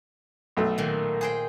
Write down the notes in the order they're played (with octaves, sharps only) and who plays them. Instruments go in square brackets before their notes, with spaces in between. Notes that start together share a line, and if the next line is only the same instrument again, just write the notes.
[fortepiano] B1 A3
[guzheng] A#2 D#3
G#4 C5 G5